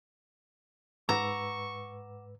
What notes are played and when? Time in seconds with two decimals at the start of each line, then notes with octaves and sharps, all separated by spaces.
1.09 G#2 B4 F#5 A#5 C#6 D6 E6 E7